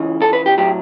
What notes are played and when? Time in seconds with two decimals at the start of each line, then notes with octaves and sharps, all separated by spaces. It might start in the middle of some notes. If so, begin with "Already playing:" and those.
Already playing: C#2 C#3 E3
0.22 A4
0.33 B4
0.46 G4
0.58 A2 F#3 G4